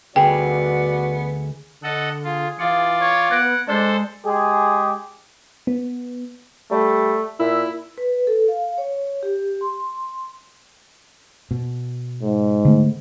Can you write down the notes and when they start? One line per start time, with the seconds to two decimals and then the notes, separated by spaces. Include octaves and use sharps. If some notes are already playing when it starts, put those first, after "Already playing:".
0.16 D2 B3 F#4 G#4 D5 G5
1.84 D3 A4 D#5 F#5
2.24 F4 G#4
2.59 E3 F4 D5 F5 C#7
3.01 C#5
3.31 B3 F#5 G#6 A#6 D7
3.68 G#3 D4 A4 C5 D5 C7
4.25 G#3 G4 G#4
5.67 B3
6.71 G3 A3
7.40 A#2 E4 E5
7.98 B4
8.27 A4
8.48 F5
8.78 C#5
9.23 G4
9.61 C6
11.51 B2
12.23 G#2
12.65 D3 A3 B3